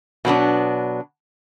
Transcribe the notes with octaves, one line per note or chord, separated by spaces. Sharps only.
B2 F#3 B3 D4